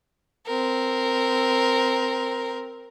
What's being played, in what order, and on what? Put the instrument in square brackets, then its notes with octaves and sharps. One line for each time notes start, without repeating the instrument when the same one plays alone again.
[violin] C4 A#4